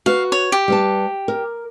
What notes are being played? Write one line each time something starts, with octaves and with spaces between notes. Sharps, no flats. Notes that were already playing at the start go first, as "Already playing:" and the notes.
F#4 B4 F5
C#5
G4
G3 B4 A5
A#4